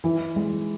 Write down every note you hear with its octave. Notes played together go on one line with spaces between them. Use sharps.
E3
G#3